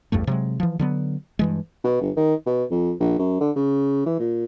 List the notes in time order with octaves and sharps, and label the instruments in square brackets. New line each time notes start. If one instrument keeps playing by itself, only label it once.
[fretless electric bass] A1 E2 G2 A3
C3 F#3 G#3
E3 F3
D3 F#3 B3
G2 E3 G#3
[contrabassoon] B2
G1
D#3
B2
F2
A#1
F#2
D3
C#3
E3
A#2